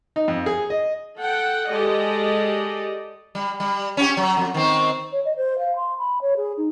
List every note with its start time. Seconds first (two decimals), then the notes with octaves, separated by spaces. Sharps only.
0.16 D#4
0.28 F2
0.46 G#4
0.70 D#5
1.17 A4 F#5 G5
1.69 G#3 G4 A4 D5 D#5
3.35 G3
3.60 G3
3.97 C#4 F4 G4
4.17 F#3
4.37 F2
4.54 D#3 C4
5.12 C#5
5.25 D#5
5.36 C5
5.58 F5
5.76 C6
5.98 B5
6.21 C#5
6.37 G#4
6.57 D#4